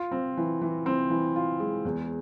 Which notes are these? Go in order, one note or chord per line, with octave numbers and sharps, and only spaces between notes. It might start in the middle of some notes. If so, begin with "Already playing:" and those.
Already playing: F4
C4
E3
E3
C4
E3
F4
G#3
E2